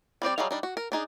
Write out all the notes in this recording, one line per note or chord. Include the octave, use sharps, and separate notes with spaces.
G3 C4 G4 D5
F#3 G3 G#4 D#5 F5
G3 D4 D#4
F#4
A#4
D4 D#4 G#4